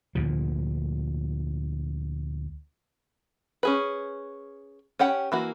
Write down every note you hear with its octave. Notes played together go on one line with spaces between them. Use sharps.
D2 A#2 F3
C#4 G#4 B4
C#4 G4 F#5 G5
E3 A#3 F#4